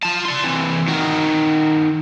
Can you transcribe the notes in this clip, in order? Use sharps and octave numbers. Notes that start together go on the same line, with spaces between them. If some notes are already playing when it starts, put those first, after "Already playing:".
F4 A5
D5 C6
C3 E3
D#3 F#4